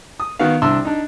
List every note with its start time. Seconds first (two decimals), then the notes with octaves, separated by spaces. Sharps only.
0.20 D#6
0.39 D#3 B3 F#4 F5
0.62 C2 D4 E5 C6 E6
0.85 D4 D#4